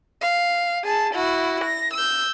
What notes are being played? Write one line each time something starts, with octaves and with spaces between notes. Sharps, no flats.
F5
G#4 A5
E4 F#4
A#6
E6 G6